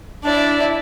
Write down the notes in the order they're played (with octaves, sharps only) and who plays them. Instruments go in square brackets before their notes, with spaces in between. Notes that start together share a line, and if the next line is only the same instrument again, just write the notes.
[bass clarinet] D4 [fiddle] E4 D5